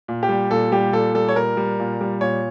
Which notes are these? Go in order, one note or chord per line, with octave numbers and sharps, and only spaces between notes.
A#2
G4
G3
A#2 A4
G3 G4
A#2 A4
G3 A4
C#5
A#2 A#4
G3
A#2
G3
A#2 C#5